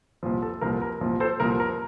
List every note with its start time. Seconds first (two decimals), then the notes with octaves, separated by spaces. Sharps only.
0.23 C2 A#2 F3
0.42 A4
0.61 C2 A#2 F3 A#4
0.82 A#4
1.01 C2 A#2 F3
1.20 A4 C5
1.40 C2 A#2 F3 A#4
1.60 A#4